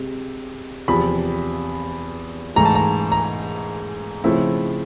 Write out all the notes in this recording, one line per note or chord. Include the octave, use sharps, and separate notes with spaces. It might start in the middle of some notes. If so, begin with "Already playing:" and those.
Already playing: C3 G#3
E2 C3 F3 B5
G#2 E3 A3 A#5
A5
A#5
A#5
C#3 F3 A3 C4 E4